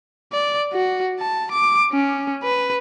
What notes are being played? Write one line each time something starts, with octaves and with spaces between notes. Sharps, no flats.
D5
F#4
A5
D6
C#4
B4